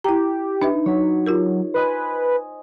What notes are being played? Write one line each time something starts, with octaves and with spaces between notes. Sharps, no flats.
E4 G4 A#5
D4 D#4 B4 E5
F#3 C#5 B6
F4 G4 A#4
B4 C5 D#5 G#5